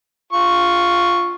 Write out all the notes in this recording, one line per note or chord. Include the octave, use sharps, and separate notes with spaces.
F4 C#6